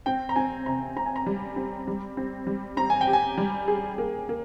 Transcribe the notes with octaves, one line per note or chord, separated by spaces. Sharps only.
C4 G5
A#5
C4 G#5
C3 A#5
C4 A#5
G#5
A#5
G3
C4
G3
C4
G3
C4 A#5
G#5
G5
G4
G#5
G3
G#4
A#3
A#3